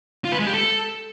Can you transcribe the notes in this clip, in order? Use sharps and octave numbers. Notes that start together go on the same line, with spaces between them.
F4
B4
G#3
G4
A4